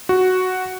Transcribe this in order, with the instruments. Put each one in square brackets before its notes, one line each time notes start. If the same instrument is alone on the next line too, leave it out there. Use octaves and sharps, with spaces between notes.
[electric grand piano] F#4